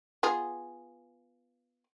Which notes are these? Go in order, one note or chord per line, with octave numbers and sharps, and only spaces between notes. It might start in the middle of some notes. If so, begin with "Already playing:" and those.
B3 F4 G#4